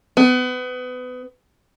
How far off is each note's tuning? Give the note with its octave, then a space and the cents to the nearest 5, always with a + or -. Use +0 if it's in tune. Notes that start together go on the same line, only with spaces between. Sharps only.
B3 +30